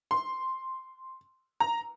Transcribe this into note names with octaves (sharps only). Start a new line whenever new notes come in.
C6
A#5